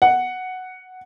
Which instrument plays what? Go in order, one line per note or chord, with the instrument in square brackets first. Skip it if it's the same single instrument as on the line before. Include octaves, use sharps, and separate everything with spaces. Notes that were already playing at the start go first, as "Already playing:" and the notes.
[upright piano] F#5